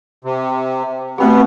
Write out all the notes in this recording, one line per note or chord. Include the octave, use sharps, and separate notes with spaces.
C3
B2 A3 B3 C4 G4